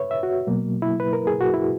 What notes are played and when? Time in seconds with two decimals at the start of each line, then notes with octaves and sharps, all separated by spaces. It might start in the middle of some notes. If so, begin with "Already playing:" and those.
Already playing: B4 C#5 E5
0.11 E5
0.23 F#4
0.47 B2 F#3 A#3
0.82 E4
1.00 B4
1.13 A#4
1.27 G#4
1.41 F#4
1.54 E4